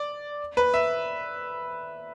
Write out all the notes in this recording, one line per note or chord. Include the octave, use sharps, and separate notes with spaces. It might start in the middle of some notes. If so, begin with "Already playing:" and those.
Already playing: D5
B4
E5